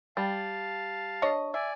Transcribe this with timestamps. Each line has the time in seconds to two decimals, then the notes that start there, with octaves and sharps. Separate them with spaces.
0.17 G3 F5 A5
1.22 D4 C#5 D#5
1.54 D5 E5 G#5